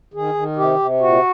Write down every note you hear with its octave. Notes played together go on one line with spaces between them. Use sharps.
D#3 G#4
D#3
C3 G4
C3
A#2 F#4